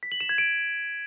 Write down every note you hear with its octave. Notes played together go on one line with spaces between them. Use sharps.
B6
F#7
E7
G#6
D7